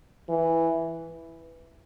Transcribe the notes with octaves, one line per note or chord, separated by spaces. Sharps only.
E3